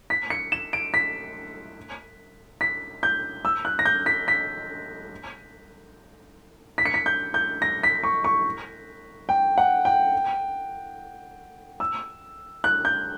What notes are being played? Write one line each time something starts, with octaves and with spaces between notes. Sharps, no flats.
B6
C#7
E7
D7
B6
B6
G6
E6
F#6
A#6
G6
B6
B6
B6
C#7
B6
G6
G6
A#6
B6
C#6
C#6
G5
F#5
G5
E6
F#6
G6